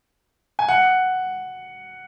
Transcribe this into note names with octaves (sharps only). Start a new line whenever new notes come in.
G#5
F#5